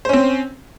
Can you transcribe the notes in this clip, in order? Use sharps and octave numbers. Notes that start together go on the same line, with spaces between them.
C4 C#4 C5